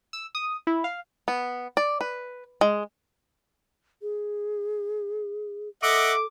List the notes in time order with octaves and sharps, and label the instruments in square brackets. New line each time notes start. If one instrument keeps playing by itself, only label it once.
[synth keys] E6
D#6
E4
F5
[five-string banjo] B3
D5
B4
G#3
[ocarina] G#4
[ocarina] A4 [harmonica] D#5 E5 F#5 [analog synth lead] D6